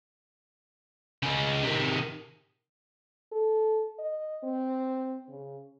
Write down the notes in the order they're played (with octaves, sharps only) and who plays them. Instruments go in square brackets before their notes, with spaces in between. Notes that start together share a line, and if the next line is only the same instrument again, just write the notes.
[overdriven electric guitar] C#3 G#3
C3 D#3
[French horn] A4
D#5
C4
C#3